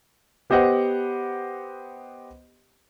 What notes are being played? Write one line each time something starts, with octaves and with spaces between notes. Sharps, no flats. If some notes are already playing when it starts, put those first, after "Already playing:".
B3 G4 C5 D#5 F#5